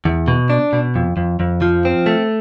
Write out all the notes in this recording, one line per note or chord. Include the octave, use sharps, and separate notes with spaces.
E2
B2
D4
B2
F2
F2
F2
F3
C4
A3